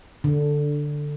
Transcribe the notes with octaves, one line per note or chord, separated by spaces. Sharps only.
D3